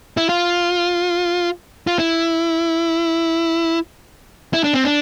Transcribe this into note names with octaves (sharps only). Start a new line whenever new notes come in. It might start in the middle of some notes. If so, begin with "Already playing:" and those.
E4
F4
F4
E4
E4
D4
C4
D4